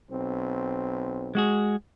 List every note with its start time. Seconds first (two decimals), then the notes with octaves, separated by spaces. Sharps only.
0.10 B1 C4
1.35 G#3 F#4 G#4